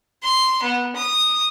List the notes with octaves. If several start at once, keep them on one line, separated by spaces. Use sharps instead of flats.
C6
B3
D#6